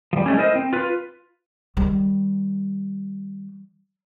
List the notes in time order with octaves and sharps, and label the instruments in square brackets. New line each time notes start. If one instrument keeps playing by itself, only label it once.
[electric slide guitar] F3 G3
G#3 A3 C#4
E4 A#4 C5 D#5
C4
F4 B4
[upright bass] D#3 G3